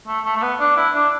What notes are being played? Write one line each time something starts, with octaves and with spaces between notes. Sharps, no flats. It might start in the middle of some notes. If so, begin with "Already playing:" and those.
A3
A3
A3
B3
D4
E4
D4